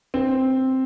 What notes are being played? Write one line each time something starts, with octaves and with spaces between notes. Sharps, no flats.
C4